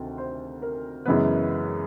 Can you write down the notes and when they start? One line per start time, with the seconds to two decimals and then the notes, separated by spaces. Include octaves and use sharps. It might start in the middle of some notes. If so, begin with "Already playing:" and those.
Already playing: D2 C3 D#3
0.18 C5
0.62 A#4
1.06 F#2 C#3 E3 G#3 B3 B4